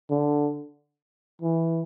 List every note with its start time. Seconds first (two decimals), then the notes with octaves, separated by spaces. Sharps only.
0.10 D3
1.42 E3